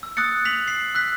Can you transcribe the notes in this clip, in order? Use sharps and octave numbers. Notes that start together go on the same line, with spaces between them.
E6
D#6 F#6 A6 C#7
B6 F7 F#7
C7
E6 F#6 B6